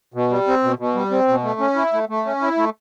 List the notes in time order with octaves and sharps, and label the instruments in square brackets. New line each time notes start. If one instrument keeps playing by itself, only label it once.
[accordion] B2
G3
C4
B2
B2
G3
C4
B2
A3
C#4
E4
A3
A3
C#4
E4
A3